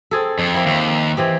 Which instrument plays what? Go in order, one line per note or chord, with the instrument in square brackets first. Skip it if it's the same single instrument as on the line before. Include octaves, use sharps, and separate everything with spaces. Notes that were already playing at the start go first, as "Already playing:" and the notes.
[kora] C4 G#4 A4
[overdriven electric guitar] F2
[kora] A#3 C4 E4
[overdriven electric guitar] D#2 [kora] F5
[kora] E3 C4 G4